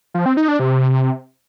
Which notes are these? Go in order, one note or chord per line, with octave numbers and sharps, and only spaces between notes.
F3
C4
D#4
D4
C3